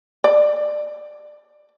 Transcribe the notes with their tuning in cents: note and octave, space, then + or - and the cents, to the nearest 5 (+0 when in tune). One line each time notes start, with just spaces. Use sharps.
D5 +25